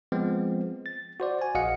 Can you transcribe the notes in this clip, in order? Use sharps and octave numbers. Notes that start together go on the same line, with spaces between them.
F3 G#3 B3 C4
A6
F#4 C5 D5
G#5
A#1 F#4 D#5 F5 F#5 C#7